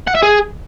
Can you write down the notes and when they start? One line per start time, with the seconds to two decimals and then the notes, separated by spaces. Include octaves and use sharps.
0.08 F#5
0.15 E5
0.23 G#4